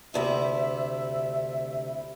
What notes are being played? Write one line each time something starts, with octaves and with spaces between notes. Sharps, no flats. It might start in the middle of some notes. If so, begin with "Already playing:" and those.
D2 C3 E4 E5